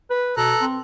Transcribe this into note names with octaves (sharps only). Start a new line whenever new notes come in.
B4
B2 A4 A#5 F#6
C4